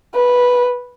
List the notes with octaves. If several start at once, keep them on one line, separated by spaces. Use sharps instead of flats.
B4